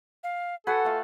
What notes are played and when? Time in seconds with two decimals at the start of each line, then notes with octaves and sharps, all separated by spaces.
0.24 F5
0.67 F#4 A4 B4 F#5 G#5
0.84 A3 F4